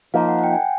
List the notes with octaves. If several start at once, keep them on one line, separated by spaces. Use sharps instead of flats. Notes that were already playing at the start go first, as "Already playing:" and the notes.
F3 A#3 D#4 F5
F#5
F#5
G5
G#5